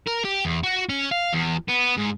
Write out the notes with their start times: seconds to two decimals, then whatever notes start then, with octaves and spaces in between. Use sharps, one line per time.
0.07 A#4
0.24 G4
0.45 E2
0.63 F#4
0.89 C#4
1.11 F5
1.33 E2
1.68 B3
1.97 G#2